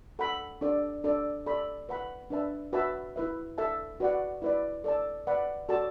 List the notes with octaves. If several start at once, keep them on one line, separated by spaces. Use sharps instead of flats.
A4 F#5 B5
D4 A4 D5
D4 A4 D5
A4 D5 B5
B4 F#5 B5
D4 B4 E5 A5
F#4 B4 E5 A5
E4 B4 E5
A4 E5 A5
F#4 B4 D5 F#5
E4 B4 D5
A4 D5 A5
B4 D5 F#5 B5
F#4 A4 D5 A5